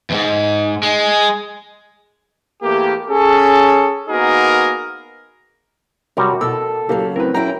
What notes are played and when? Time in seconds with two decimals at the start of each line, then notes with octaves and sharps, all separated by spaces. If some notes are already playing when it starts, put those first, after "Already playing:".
0.10 E2 G#2
0.83 G#3
2.63 E2 A3 A#3 G4
3.09 C#4 G#4 A4
4.09 A#3 B3 D#4 F#4 G#4 A#4
6.17 F#2 C3 G3 F#4 A#4
6.41 B2 A4 A#4 E6
6.89 C#3 F#3 A#3 G4
7.16 A2 C4 A#4 B4
7.34 F#3 C#4 E4 G5 A#5